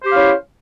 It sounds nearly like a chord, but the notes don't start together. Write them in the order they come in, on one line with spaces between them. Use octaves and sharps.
C5 G4 F5 C#4 E4